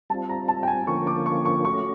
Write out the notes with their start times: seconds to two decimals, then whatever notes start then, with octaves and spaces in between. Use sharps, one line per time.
0.10 G3 C4 F4 A5
0.29 A#5
0.48 A5
0.63 G5
0.67 G#5
0.87 D3 F3 A#3 C#4 F4 C#6
1.07 D6
1.26 C#6
1.45 C#6
1.65 A3 C#4 F#4 C#6